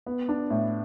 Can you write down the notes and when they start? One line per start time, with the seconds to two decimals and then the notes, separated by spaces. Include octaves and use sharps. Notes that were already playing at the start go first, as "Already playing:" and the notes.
0.06 B3
0.29 D4
0.50 A2